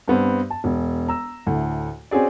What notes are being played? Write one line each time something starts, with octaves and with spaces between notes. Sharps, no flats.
G2 B3 C4
A5
E1
A#5 E6
D2 A2
C4 C#4 F#4 G#4 D5